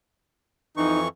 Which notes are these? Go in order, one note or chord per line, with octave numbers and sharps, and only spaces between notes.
F2 E3 D#4 C#6